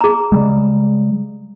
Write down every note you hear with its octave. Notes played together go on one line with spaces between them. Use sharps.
G#4 A#5
C#3 G3 G#3